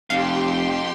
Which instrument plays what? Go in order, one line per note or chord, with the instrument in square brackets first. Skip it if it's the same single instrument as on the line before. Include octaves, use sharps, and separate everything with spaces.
[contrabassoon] F1 [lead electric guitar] F2 [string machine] G4 G5 C6 [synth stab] F5